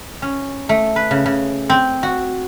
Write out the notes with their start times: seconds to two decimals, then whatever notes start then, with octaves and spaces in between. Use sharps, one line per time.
0.22 C#4
0.69 A3
0.96 B4
1.11 C#3
1.26 C#3
1.70 C4
2.03 F#4